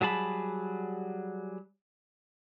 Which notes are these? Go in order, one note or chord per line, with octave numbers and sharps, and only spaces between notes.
F#3 G3 G#4 A5 B5